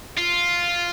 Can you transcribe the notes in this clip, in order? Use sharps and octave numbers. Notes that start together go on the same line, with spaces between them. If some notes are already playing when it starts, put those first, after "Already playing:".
F4